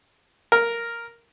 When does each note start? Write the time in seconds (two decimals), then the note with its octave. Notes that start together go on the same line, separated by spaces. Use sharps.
0.52 A#4